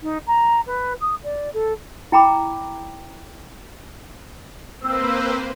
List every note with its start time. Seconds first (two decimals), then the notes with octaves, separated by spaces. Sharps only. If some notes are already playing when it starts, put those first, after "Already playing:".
0.02 D#4
0.27 A#5
0.67 B4
1.01 D#6
1.23 D5
1.53 A4
2.12 E4 G5 A#5 B5 D6
4.83 A#3 C4 B4 C5 E6